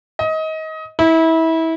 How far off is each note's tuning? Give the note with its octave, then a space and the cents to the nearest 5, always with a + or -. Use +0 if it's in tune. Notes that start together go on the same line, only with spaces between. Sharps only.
D#5 +25
E4 -25